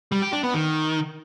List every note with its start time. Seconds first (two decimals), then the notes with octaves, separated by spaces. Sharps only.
0.12 G3
0.22 G4
0.33 D4
0.43 B3
0.54 D#3